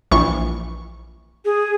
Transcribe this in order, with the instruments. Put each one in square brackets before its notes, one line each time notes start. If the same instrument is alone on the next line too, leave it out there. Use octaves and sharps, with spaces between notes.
[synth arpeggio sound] A#1 E3 C#6
[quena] G#4